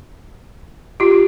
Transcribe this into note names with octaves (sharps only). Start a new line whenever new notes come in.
F4 G4